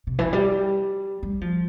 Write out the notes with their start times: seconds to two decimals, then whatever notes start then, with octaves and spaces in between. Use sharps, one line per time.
0.07 C3
0.19 E3
0.33 G3
1.23 G3
1.41 F3